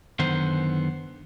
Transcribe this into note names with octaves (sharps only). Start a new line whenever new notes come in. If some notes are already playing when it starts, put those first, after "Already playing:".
F#2 D3 D#3 B3 C5